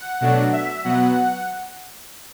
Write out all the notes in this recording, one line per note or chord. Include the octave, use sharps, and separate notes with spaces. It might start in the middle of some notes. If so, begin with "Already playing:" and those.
Already playing: F#5
B2 F#3 A3 D4
E5
B2 F#3 B3 F#5